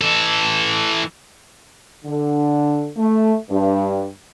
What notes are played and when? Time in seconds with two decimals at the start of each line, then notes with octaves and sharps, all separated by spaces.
0.01 E3 A4
2.05 D3
2.97 A3
3.50 G2